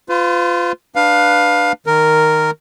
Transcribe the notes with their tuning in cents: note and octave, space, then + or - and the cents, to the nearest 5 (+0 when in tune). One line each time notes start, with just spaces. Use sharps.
F4 +0 B4 +45
D4 +15 B4 +0 F5 +15
D#3 +0 A#4 -5